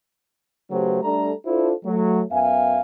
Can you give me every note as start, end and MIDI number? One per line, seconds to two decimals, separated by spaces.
0.71 1.02 49
0.71 1.02 54
0.71 1.02 57
0.71 1.02 67
0.71 1.02 71
0.71 1.02 72
1.03 1.32 55
1.03 1.32 57
1.03 1.32 62
1.03 1.32 69
1.03 1.32 82
1.46 1.72 62
1.46 1.72 64
1.46 1.72 65
1.46 1.72 69
1.46 1.72 72
1.85 2.22 54
1.85 2.22 57
2.31 2.80 42
2.31 2.80 59
2.31 2.80 76
2.31 2.80 77
2.31 2.80 80